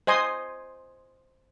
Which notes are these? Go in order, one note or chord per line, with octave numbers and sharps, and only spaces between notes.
C5 D#5 G#5 C6 D#6